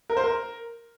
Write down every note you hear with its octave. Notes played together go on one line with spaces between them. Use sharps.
A#4
C5
A#4